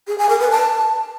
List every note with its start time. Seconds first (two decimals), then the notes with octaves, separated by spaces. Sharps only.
0.07 G#4
0.18 G#5
0.29 A#4
0.40 B4
0.51 A5